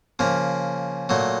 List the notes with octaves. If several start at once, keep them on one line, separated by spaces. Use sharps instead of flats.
C#3 F3 A#3
A#2 F#3 A3